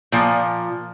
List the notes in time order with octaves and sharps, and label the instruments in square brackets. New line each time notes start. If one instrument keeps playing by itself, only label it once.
[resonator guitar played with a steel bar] A#2 F3